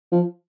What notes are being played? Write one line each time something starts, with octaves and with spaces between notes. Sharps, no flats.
F3